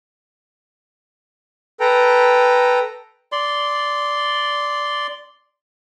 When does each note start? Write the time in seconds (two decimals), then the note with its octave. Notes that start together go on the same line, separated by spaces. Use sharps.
1.80 A4 B4 G5 A#5
3.32 D5 C6